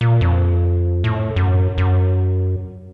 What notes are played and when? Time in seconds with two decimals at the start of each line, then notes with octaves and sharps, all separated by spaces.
0.01 A#2
0.21 F2
1.04 A2
1.36 F#2
1.78 F#2